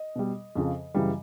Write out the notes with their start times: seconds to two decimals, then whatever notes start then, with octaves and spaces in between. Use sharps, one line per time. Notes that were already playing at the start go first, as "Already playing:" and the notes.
Already playing: D#5
0.15 B2 G3
0.55 F2 C#3 F3
0.94 F#2 C#3 E3 G3